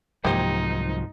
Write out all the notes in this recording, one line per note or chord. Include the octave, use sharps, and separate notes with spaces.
C2 G#2 F3 F#3 A#3 D#4 G4 C5